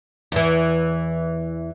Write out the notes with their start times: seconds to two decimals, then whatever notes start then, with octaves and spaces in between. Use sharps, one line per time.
0.32 E2 E3